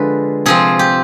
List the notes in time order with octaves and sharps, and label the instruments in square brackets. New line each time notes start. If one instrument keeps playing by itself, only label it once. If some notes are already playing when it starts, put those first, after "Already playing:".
Already playing: [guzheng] D3 F3 G#3 B4
C3 F3 C4 G#4
G4